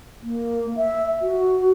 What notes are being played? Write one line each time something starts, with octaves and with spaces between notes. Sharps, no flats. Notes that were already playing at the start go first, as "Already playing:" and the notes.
A#3
E5
F#4